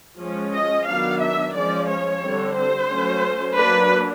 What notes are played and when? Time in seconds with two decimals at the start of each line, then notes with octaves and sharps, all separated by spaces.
0.19 F3 G#3 C#4
0.53 D#5
0.87 D#3 F#3 B3 D4 F5
1.21 E5
1.54 F3 G#3 C#4 D5
1.87 C#5
2.22 D3 G3 C4
2.56 C5
2.90 F#3 A3 C#4
3.56 F#3 A#3 D4 B4